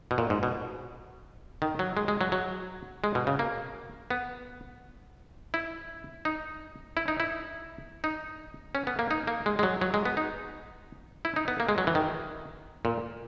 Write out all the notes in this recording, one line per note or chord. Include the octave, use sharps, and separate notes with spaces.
B2
A#2
G#2
B2
D#3
F#3
G#3
G#3
F#3
F#3
G#3
B2
C#3
A#3
B3
E4
D#4
E4
D#4
E4
D#4
C#4
B3
A#3
D#4
A#3
G#3
G#3
F#3
F#3
G#3
B3
D#4
E4
D#4
B3
A#3
G#3
F#3
E3
D#3
A#2